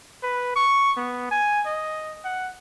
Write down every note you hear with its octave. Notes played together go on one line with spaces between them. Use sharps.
B4
C#6
B3
G#5
D#5
F#5